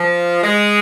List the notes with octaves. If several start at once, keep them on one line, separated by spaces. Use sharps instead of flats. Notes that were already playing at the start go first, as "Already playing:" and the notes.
Already playing: F3
G#3